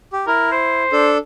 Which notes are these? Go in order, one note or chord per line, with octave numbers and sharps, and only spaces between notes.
G4
E4 A#4
C5
D4 A4